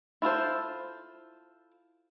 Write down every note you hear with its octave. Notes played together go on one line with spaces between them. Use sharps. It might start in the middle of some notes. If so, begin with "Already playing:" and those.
E4 F4 A4 C5